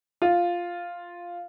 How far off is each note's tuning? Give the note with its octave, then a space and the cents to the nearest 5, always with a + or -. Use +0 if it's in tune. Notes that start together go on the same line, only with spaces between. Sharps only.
F4 +0